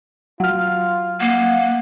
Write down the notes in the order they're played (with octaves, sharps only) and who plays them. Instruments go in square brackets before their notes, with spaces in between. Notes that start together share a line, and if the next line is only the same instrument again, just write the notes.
[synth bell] F#3 F6 [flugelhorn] F4
[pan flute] A#3 [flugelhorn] F#5